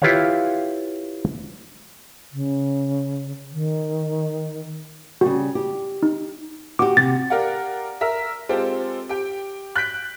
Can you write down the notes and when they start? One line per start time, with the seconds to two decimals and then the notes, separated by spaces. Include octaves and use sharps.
0.02 E4 F4 G4 B4 C#5 F5
2.32 C#3
3.52 D#3
5.21 C#3 G3 F#4
5.55 G4
6.03 D#4
6.79 F#4 G4 D6
6.97 C3 A6
7.30 G4 A#4 D5 F5 F#5
8.01 A#4 E5 A#5
8.49 G#3 C4 F4 G4 A4
9.09 G4 G5
9.76 F#6 G6 B6 D7